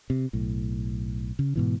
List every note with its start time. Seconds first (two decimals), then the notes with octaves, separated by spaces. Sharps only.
0.10 C3
0.33 B1 A2
1.39 C#3
1.56 G#2 B2 E3